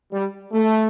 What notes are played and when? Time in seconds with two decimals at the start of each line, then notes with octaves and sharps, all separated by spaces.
0.11 G3
0.53 A3